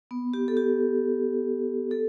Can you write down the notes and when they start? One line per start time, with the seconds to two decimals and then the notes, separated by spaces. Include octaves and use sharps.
0.11 B3
0.34 G4
0.48 A4
0.57 G4
1.91 A4